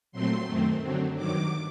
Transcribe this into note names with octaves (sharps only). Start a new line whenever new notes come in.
A#2 F#3 A3 C4 C6
F#2 D#3 A3 C4
D3 F#3 C4
G2 D#3 F#3 D6